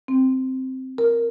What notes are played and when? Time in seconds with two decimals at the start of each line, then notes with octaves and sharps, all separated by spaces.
0.08 C4
0.98 A#4